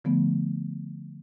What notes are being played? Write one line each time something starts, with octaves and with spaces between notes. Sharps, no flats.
D3 F3 A3 B3